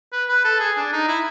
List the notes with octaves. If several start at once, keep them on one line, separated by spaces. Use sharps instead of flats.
B4
B4
A4
G#4
D4
D#4
E4